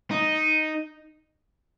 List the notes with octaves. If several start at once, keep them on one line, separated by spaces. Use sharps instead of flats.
D#4